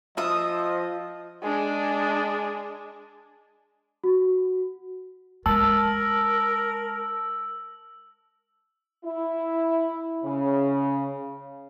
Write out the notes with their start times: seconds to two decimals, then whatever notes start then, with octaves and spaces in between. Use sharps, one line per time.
0.17 F3 F4 D#5 E5 D#6
1.43 G#3 D4
4.04 F#4
5.46 G#3 A#4 A5 E6
9.05 E4
10.24 C#3